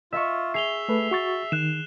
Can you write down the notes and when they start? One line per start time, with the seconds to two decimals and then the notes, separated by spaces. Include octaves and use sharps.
0.13 F4 E5 C#6
0.54 G#4 E5 C7 F7 G7
0.89 A3 A4 B4
1.11 F#4 C#6 A6
1.52 D#3 F#6 E7